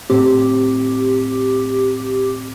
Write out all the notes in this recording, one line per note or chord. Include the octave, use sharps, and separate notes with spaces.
A2 C4 G4